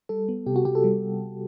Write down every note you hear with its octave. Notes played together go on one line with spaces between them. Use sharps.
G3 A4
B3
C3 G4
F#4
C3 G4
A4
G3